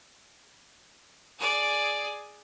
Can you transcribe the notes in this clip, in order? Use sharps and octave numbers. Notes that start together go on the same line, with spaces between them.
G#4 D5